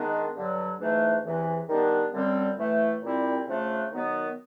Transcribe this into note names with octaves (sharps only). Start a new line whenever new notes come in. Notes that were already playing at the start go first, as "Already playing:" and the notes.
Already playing: D#3 G#3 B3 D4
G2 D3 F#3
G#2 E3 A3 D4
E2 C3 E3
D#3 G3 B3 D4
F#2 D3 G3 C4
A2 E3 A3
A#2 G3 C4 E4
C#3 F3 A3 D4
D#3 F#3 B3